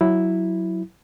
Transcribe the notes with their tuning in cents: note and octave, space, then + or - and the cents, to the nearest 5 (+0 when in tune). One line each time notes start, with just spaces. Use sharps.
F#3 +0 E4 +0